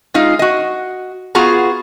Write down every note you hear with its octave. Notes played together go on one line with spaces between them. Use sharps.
G#3 D#4 F4
F#4 D#5
B3 F4 F#4 G#4 A#5